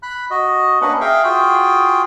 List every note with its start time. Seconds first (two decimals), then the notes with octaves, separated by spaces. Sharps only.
0.03 B5 F#6
0.30 F#4 D#5
0.81 A#3 C#4 D4 B4 D#5 F#5
1.01 G#4 E5 F5 G5
1.24 F4 F#4 G#4 G5